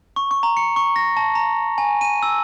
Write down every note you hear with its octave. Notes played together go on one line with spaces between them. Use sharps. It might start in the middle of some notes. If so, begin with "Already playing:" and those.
C#6
C#6
A#5
C#7
C#6
A#6
A5
A#5
G#5
D#7
E6